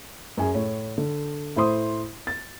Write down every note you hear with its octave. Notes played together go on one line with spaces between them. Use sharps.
F#2 C#4 G#4 G#5
A2 C#5
D3
A2 E4 C5 C6 D#6
A6